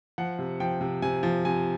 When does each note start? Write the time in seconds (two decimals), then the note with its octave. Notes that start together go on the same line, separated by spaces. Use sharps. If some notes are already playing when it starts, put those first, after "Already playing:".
0.18 F3 F#5
0.39 C3
0.60 F3 G5
0.81 C3
1.02 C3 G#5
1.23 F3
1.45 C3 G#5